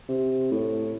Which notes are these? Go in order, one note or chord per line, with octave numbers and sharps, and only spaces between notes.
C3
A2